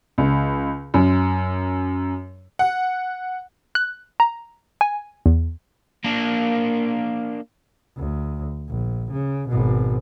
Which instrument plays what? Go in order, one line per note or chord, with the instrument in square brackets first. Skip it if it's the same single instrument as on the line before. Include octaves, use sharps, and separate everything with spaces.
[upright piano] C#2
F#2
[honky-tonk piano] F#5
[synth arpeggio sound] F#6
A#5
G#5
E2
[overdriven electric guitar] A#3 D4
[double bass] D2
A#1
C#3
G#1 B2